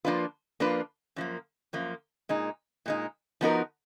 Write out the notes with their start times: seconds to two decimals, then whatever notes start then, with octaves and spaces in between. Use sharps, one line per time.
0.05 F3 A#3 D4 F4 B4
0.60 F3 A#3 D4 F4 B4
1.16 F#2 F3 A#3
1.73 F#2 F3 A#3
2.29 A#2 G#3 D#4
2.86 A#2 G#3 D#4
3.41 F3 B3 D#4 F#4 A#4